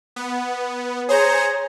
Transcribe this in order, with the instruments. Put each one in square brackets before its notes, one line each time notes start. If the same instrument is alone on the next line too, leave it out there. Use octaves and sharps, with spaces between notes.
[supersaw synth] B3
[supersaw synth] G#4 C5 A#5 [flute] C#5